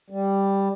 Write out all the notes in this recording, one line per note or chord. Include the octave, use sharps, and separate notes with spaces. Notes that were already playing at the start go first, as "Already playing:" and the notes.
G3